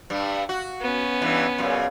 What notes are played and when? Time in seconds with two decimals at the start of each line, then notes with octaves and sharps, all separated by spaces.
0.10 G2 G3
0.49 F#4
0.81 B3 C#4
1.22 G2 E3
1.58 F#2 A#2 C#3